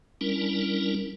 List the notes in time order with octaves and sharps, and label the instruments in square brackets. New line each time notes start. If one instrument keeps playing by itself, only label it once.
[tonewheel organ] G3 C#4 D4 E4 A#4